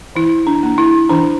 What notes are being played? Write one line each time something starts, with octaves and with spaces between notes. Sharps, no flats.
E3 E4
D4
A#3 D4
E4
E3 D4